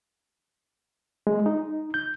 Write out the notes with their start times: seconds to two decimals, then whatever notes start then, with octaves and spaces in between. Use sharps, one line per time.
1.27 G#3
1.46 D#4
1.94 G6